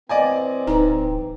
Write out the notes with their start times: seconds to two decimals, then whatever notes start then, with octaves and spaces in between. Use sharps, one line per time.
0.09 E3 C4 D5 D#5 G#5
0.67 D1 D#4 B4 A#5